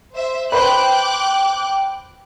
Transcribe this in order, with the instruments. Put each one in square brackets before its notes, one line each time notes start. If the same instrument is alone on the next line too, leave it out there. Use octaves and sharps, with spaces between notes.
[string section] C5 E5
[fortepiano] B4 C5 [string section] G5 D6 F#6